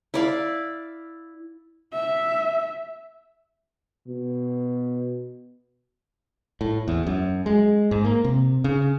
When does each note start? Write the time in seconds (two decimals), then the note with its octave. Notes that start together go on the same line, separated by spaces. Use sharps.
0.14 E4 D5 F5
1.94 E5
4.08 B2
6.61 A2
6.88 E2
7.07 F#2
7.46 G#3
7.91 G#2
8.05 A#3
8.24 C3
8.64 C#3